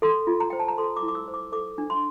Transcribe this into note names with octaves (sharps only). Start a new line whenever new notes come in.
A4 C6
F4
A#5
C5 G5
A5
A#5
A4 C6
D6
E4
D6
E6
C5
D6
A4 D6
D4
C6